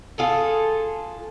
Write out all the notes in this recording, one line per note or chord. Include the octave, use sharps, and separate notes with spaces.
F4 G#4 A4